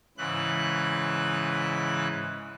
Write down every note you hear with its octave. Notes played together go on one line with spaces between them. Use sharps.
G#2 C#3 E3 B4 F#6